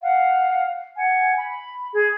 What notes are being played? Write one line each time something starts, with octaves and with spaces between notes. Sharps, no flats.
F5 F#5
F#5 G#5
B5
G#4 G#6